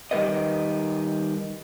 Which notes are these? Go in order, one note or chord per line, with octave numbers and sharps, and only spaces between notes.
D#3 G3 E4 A#4 B4 D#5